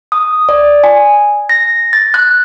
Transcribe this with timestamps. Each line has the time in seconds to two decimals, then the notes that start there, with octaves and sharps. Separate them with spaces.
0.12 D#6
0.49 D5
0.84 G#5
1.49 A#6
1.93 A6
2.14 F#6